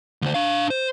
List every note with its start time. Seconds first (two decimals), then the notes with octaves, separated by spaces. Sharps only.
0.22 D2 C5
0.34 D4 F5
0.70 C5